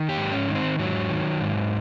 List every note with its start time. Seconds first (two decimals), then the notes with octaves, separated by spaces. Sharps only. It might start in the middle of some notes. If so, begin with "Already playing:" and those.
Already playing: D#3
0.09 G4
0.17 G#2
0.32 C#4
0.48 D#3
0.55 C4
0.79 G#2 F#3
1.09 D#3
1.41 G#2